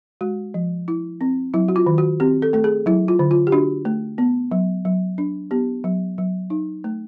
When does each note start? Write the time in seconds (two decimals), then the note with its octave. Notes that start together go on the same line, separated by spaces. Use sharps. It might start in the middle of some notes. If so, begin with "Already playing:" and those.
0.21 G#3 F#4
0.54 F3
0.88 E4
1.21 C4
1.54 F#3 E4
1.68 F#4
1.76 F4
1.86 D#3
1.98 F#4
2.20 C4 G4
2.42 A4
2.53 A3 A4
2.64 G#4
2.86 F#3 E4
3.08 F4
3.19 D3
3.31 F4
3.47 G4
3.52 D4 F#4
3.85 A3
4.18 B3
4.52 F#3
4.85 F#3
5.18 D4
5.51 B3 G4
5.84 F#3
6.18 F#3
6.50 D#4
6.84 A3